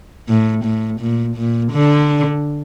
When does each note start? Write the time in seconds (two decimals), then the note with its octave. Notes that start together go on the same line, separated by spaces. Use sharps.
0.29 A2
0.65 A2
1.01 A#2
1.37 A#2
1.72 D3